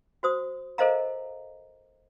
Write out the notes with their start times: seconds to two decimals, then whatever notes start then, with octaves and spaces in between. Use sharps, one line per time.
0.23 F#4 C5 D#6
0.78 A4 A#4 C5 D#5 F5 A#5